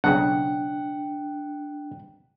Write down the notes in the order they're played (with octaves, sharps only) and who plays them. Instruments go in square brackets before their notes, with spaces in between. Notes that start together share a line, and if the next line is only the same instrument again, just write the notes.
[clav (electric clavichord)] B1 C#3 [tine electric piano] D4 G5 [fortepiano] F#5